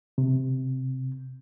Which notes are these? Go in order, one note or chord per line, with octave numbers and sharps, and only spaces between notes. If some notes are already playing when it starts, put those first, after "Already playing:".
C3